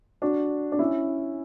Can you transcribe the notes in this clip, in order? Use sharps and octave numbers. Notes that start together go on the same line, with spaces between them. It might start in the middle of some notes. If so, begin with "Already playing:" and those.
D4 F#4
D4
C#4 E4